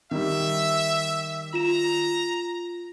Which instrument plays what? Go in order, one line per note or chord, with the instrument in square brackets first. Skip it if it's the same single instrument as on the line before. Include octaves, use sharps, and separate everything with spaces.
[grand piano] D#3 G3 [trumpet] E5
[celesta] F4 E7 [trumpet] A#5